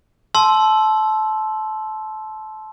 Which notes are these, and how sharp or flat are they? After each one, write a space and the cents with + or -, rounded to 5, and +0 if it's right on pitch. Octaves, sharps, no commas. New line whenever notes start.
A5 -20 C6 +0 E6 +0